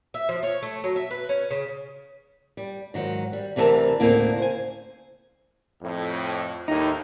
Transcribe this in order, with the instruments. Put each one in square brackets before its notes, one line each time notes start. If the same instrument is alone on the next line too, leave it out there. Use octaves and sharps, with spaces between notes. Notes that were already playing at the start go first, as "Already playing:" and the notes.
[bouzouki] E5
F3
C#5
A3
F#3
E5
B4
C#4
C#3
[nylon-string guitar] G3
G#2 D#3 F#3
G3
D2 C3 E3 G#4 A#4 A5
D2 A2 C#3 A#3 C4
C5 G#5
[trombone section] F2 A2
[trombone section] D#2 A2 [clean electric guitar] D#4